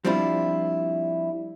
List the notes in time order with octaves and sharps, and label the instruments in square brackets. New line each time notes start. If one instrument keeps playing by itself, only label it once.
[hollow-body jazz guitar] F3 G3 C4 D4 E4 F4